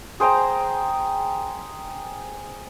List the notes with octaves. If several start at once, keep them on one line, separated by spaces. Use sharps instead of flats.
G#4 C5 G5 A#5